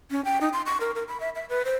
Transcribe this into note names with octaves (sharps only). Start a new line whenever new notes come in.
C#4
G5
D#4
C6
C#6
A#4
A#4
B5
E5
E5
B4
C5